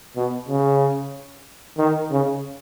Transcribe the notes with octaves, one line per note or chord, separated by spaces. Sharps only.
B2
C#3
D#3
C#3